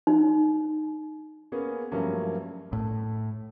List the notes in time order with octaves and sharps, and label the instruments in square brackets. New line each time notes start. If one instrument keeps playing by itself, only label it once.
[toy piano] D#4
[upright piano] A#3 B3 C#4 G#4
G2 F3 F#3 A3 A#3 C#4
[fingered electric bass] A2